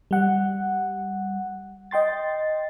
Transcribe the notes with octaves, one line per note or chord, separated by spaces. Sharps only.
G3 F#5
D#5 G5 C6 A6